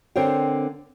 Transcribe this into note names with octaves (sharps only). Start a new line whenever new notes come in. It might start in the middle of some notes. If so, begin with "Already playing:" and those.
D3 C4 A#4 C5 C#5 G5